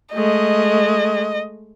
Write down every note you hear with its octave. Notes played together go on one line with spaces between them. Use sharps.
G#3 A3 D#5